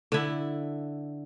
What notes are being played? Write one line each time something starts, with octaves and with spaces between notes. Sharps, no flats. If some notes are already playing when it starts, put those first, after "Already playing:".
D3 E4